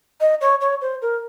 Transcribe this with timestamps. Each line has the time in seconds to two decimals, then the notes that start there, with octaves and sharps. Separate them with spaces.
0.21 D#5
0.41 C#5
0.61 C#5
0.81 C5
1.02 A#4